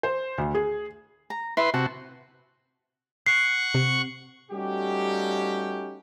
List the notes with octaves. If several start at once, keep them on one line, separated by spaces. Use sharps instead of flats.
C5
D2
G#4
A#5
E4 B4 E5 C6
C3 F#4 A5
F#5 C#6 C7
C3
G3 A3 C#4 D#4 F#4 G4